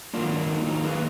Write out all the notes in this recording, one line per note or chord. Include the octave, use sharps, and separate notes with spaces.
D#3 F#3 A#3 D4 F4
D4
D#4
D#3 F#3 A#3 D#4
G#4 B4